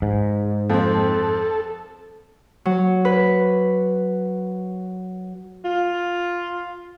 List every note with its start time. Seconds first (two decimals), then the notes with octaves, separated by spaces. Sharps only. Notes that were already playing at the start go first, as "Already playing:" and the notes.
0.02 G#2
0.70 F2 C4 A4
2.65 F#3
3.05 B4
5.65 F4